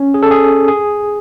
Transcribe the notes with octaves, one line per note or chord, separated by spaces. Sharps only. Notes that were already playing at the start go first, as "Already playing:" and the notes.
Already playing: C#4
G#4
A4
G#4
G#4